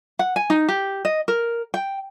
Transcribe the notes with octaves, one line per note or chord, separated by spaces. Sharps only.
F#5
G#5
D#4
G4
D#5
A#4
G5